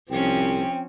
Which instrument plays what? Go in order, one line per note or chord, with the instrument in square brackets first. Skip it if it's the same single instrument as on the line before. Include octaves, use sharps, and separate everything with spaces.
[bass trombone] C2 [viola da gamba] F3 C#4 [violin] C4 [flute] G5